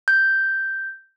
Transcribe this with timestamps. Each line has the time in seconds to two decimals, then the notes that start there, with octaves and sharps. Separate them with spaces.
0.08 G6